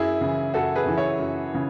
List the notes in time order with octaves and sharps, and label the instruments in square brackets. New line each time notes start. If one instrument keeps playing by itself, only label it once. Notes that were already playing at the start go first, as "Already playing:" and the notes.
Already playing: [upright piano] F#2 E4 G#4
C#3 E3
F#2 F#4 A4
G#4 B4
C#3 E3
C#5 E5
F#2
C#3 E3